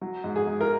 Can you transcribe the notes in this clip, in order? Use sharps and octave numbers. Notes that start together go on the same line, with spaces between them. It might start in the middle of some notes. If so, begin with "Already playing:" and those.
F#3
G#2
G#4
G#2
A#4